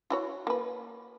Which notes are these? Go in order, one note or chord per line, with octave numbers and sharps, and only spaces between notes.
E4 F#4 C#5
A#3 B4